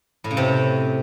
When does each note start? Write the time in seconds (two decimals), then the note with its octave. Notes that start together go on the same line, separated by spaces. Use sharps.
0.24 A2
0.31 C#3
0.37 C3